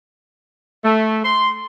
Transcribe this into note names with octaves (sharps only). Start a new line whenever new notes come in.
A3
C6